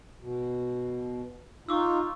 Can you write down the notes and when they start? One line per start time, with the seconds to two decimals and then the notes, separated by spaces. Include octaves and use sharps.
0.22 B2
1.69 D#4 F4 C#6 D6 E6